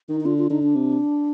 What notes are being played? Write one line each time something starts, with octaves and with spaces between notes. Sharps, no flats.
D#3 D#4
D#4
D3 F4
F4
D3 D#4
D4
C3